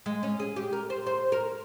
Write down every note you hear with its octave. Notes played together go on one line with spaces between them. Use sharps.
G#3
C#4
G#4
G4
A#4
C5
C5
A#4